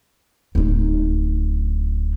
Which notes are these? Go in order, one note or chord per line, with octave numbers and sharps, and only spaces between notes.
D1 D#4